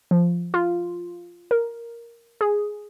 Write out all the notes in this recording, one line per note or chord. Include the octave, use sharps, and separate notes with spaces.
F3
F4
A#4
G#4